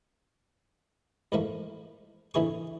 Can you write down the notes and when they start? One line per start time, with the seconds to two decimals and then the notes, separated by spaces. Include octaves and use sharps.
1.32 E2 G#2 D#3 F3 A3 A#3
2.34 A#1 D3 E3 E4 G#4 C#6